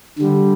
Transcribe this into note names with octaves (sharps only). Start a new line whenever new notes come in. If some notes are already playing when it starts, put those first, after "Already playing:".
D3 G3